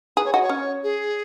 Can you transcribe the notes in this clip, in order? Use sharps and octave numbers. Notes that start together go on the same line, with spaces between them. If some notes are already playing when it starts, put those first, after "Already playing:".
G#4 B4
C#5
F#4 D#5
C#5
C#4
G#4